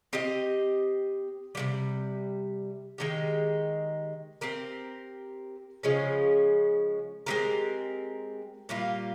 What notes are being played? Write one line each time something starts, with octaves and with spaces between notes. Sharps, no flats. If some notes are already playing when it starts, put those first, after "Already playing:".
C4 G4 C5 D#5
C3 D#3 G3
D#3 G#3 D#4 G4
C4 G4 A#4
C#3 F3 G#3 C#4
G#3 C4 G4 A#4
A#2 G3 A#3 F4